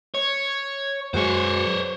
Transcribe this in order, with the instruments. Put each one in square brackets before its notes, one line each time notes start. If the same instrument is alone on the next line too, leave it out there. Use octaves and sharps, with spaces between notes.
[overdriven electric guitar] C#5
[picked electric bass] F#2 F#3 G#3 [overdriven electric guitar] C5 C#5